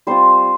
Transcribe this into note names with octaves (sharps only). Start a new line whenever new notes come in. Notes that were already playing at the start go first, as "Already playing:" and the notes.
G3 C4 F4 C5 C6